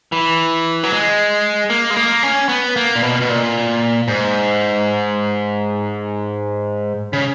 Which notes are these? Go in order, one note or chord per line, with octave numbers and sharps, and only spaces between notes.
E3
F#3
G#3
A#3
G#3
A#3
C#4
B3
A#3
A#2
B2
B2
A#2
G#2
C#3